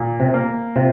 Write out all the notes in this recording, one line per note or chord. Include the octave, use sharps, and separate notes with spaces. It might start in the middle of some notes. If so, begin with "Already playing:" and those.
Already playing: A#2
C3
A#3
C3 F4